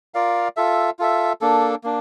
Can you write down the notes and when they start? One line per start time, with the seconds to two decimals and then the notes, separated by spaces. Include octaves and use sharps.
0.14 F4 A#4 D5 F5
0.57 F4 A4 E5
0.99 F4 A4 E5
1.41 A#3 D4 A4
1.84 A#3 D4